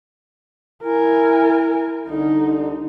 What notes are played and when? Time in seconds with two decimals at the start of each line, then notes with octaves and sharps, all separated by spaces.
0.84 E4 A#4 G#5
2.08 C2 D3 D#4